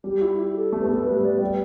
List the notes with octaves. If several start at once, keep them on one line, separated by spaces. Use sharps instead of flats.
G3 G4
E4
G4
A4
A3 G4
B3
A3 A4
G3 B3 B4
D5
G3 B3 G5